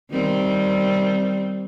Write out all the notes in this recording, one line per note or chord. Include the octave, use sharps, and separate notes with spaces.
D#3 G3 C4